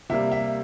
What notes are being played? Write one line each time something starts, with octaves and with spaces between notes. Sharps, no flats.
C3 G3 A#3 E5
E5